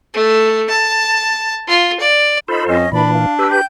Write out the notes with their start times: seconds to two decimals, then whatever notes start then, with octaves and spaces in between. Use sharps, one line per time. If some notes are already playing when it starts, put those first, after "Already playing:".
0.14 A3
0.69 A5
1.68 F4
2.00 D5
2.48 D#4 F4 A4 C5 B5
2.68 F2 C#4 D#5
2.92 A#2 E3 D4 D5 B5
3.12 F5
3.39 G4 B4 E6
3.51 G5 G6